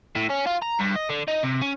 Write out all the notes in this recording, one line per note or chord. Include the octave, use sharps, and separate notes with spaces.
A2
C#4
F4
A#5
G2
D#5
D3
D#4
C3
C#4